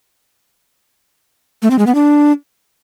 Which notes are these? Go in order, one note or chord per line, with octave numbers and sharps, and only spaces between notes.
A3
C4
G#3
B3
D4